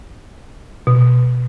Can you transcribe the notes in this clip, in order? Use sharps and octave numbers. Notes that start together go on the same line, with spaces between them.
B2